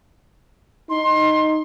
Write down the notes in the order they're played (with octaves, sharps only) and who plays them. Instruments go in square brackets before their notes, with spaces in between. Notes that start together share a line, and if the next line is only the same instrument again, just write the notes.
[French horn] D#4 [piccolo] C6